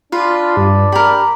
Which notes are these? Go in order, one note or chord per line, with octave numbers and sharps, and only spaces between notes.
D4 F4 B4
G2
G4 A#4 B5